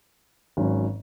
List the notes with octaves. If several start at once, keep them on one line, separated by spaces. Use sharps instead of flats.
G#1 G#2 F#3 C#4